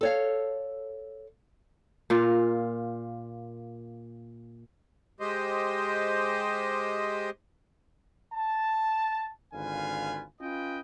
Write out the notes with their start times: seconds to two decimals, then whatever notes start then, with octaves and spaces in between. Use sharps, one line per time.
0.01 A4 C#5 F5
2.10 A#2 F4
5.20 G#3 G4 C5 D#5
8.33 A5
9.54 G#1 D3 F4 B4 F5 G#5
10.40 C#4 F4 B4 D#5 G5 G#5